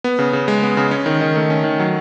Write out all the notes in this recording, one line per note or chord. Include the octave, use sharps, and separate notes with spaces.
B3
C#3
C#3
G#3
B3
C#3
C#4
D#3
D#3
A3
C#4
D#3
F#3